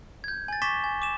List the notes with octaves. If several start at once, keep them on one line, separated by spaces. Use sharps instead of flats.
G6 G#6
G#5 A6
C#6 D6 A6 B6 E7 G7
G#5
D6 E7